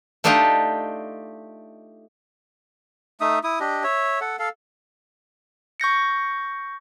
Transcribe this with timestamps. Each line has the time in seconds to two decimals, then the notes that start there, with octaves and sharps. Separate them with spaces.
0.24 A3 D4 D#4 F4 G4 D#5
3.21 A3 D#4 E5 D#6
3.44 E4 D#6
3.60 D4 G4 D#5
3.83 C#5 E5
4.21 A4 F#5
4.39 A4 F5
5.80 C#6 G6 A#6 C#7